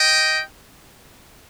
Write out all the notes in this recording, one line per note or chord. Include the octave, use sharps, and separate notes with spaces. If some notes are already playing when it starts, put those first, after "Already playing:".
Already playing: D#5 G5